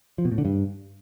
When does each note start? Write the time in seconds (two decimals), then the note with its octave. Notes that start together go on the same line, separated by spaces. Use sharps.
0.18 F3
0.25 B2
0.31 A2
0.38 D3
0.45 G2